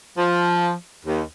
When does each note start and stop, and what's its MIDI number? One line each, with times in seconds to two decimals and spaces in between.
0.18 0.72 53
1.04 1.22 39